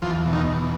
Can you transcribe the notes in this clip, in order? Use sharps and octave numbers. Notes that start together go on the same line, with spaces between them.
E2 F3 F4
B2
D#3 D#4
E2